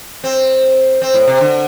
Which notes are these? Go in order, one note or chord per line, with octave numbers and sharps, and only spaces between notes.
C4
C4
A2
C3
D3